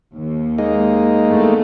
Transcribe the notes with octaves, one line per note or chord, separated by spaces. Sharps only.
D#2
G#3 A#3 D#4
E2 A3